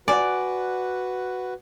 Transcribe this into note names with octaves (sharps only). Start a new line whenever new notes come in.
F#4 B4 D5 F#5 G#5